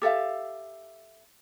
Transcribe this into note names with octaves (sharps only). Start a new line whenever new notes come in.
G4 A4 E5 F5